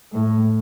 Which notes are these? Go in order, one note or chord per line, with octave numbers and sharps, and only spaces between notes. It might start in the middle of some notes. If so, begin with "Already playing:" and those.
A2